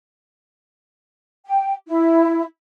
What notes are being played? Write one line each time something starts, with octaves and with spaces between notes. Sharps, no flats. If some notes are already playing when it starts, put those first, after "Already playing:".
G5
E4